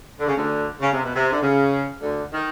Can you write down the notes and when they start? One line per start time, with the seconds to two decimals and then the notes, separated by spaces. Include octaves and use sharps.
0.19 D3
0.27 C#3
0.37 D2 D3
0.81 C#3
0.92 C3
1.03 B2
1.15 C3
1.32 D3
1.42 C#3
2.02 D2 D3
2.32 D#3